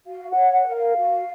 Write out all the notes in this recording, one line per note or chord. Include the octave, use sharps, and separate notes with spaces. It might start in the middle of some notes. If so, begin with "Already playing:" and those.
F#4 F5
F#5
C#5
F#5
A#4
F5
F#4